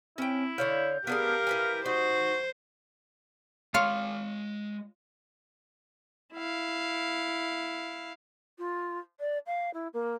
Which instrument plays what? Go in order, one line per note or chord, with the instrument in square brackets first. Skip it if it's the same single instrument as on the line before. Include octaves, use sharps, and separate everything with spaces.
[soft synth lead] C4 [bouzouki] C#4 G5 [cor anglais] E4
[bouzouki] D3 C#5 F5 [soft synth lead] G6
[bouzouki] B3 D4 G#4 [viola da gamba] G4 A#4 [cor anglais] F5
[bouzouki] E4 B4 G#5
[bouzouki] D#4 [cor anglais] F#4 [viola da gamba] C5
[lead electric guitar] G#3 B5 [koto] F4 C#5 F5
[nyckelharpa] E4 F5
[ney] F4
D5
F5
E4
A#3